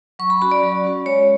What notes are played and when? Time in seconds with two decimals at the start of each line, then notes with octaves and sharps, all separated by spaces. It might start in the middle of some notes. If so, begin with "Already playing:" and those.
0.19 F#3 C#6
0.30 B5
0.41 C#4 F#4 B5
0.52 D5
0.63 F#3
0.84 C#4 F#4
1.06 G#3 C#5